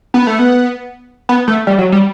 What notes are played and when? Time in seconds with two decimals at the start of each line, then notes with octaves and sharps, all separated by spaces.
0.14 B3
0.27 A3
0.39 B3
1.29 B3
1.48 A3
1.67 G3
1.78 F#3
1.92 G3